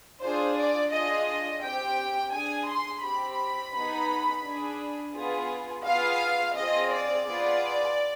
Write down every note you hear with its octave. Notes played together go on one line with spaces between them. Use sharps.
D4 F4 G#4 C5
D5
D4 F4 G#4 D#5
C4 G4 G5
D4 G#4 G#5
C6
C4 G4 B5
B3 D#4 G#4
D4 G#4
B3 F4 G#4
B3 F4 G#4 F5
C4 F4 G#4 D#5
D5
B3 F4 G#4